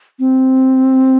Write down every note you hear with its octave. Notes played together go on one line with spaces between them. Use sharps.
C4